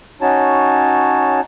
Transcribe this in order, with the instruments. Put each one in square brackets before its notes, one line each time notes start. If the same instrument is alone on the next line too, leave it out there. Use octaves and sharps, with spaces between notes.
[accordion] C#4 D#4 F#4 C#5 A5